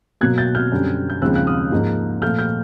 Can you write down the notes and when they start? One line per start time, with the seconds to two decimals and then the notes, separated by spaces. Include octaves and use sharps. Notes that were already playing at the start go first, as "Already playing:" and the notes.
0.21 B2 F#3 A#3 F#6 G#6
0.38 G6 A6
0.55 F6 G6
0.72 F#2 D3 G3 C4
1.10 G6
1.22 D#2 C#3 F3 G#3 C4 E6 F#6
1.36 F#6
1.47 D#6 F6
1.72 G#2 F3 A#3 D#4
2.22 A#2 F3 A3 F6 G6
2.39 F6 G6